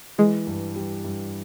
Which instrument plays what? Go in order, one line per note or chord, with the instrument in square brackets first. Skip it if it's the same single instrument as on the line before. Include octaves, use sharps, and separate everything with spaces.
[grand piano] E3 [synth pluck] G#3
[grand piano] G2
G3
G2